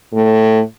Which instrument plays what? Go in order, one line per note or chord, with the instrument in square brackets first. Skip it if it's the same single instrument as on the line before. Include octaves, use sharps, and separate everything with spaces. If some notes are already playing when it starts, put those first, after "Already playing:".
[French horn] A2